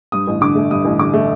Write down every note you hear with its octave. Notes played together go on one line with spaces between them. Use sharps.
G2 D#6
A1
D3 D6
A3
G2 D#6
A1
D3 D6
A3